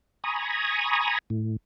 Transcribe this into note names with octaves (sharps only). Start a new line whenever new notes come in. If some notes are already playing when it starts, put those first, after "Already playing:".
G#5 A#5 B5 C#6 D#6
A2